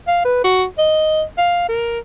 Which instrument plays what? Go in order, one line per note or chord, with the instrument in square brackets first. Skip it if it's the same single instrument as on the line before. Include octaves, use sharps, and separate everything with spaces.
[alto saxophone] F5
B4
F#4
D#5
F5
A#4